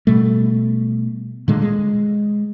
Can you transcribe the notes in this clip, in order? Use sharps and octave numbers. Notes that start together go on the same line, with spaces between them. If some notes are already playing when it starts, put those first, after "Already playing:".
B2 G3 A3
A#2 D3 G#3
G#3